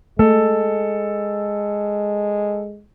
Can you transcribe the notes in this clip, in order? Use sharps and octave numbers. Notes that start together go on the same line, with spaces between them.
G#3 A3 A4